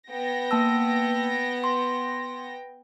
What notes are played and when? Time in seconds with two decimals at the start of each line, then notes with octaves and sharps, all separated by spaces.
0.11 B3 G5 A#6
0.51 A#3 A5 E6
1.64 C6